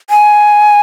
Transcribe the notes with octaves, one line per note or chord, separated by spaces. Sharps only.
G#5